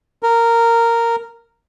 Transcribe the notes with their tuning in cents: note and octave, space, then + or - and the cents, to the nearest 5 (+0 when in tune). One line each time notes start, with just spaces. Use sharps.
A#4 -10